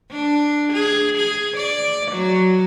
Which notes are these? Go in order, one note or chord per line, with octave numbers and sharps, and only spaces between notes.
D4
G#4
G#4
D5
F#3